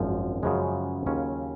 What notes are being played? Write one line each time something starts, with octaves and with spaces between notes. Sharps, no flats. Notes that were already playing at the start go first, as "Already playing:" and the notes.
Already playing: G#1 F#2 F3
F#2 C#3 F3 G#3
D#2 C#3 F#3 C#4 F4